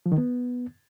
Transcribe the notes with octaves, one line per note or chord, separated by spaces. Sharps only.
F3
D#3
B3